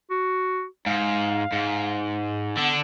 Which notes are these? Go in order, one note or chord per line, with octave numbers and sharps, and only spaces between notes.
F#4
G#2 F5
G#2
D3 B3 D4